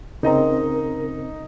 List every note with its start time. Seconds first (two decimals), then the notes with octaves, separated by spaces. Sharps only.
0.23 C#3 C4 D#4 A#4 D#5 A#5